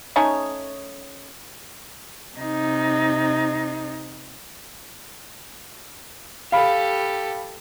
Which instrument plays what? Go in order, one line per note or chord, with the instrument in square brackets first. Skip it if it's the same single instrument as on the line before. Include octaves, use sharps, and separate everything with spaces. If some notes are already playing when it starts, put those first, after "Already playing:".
[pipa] A3 C#4 D#4 C#5
[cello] C3 D#4
[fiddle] G4 A4 [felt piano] F5 B5